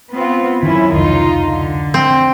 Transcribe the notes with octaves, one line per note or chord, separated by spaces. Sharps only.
B3 C4 F4
F#2 D#3 C#4 E4
F1 C#2 D#4 F4
D3
C4